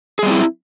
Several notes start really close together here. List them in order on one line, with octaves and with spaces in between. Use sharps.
G#4 G3 C4 E4